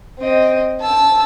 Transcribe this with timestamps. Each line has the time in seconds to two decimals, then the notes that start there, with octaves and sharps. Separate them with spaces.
0.19 C4 D#5
0.80 A5 E6